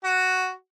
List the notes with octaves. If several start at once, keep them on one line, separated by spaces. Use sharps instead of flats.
F#4